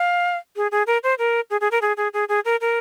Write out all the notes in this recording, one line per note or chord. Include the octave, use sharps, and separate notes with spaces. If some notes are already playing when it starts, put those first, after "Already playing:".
Already playing: F5
G#4
G#4
A#4
C5
A#4
G#4
G#4
A#4
G#4
G#4
G#4
G#4
A#4
A#4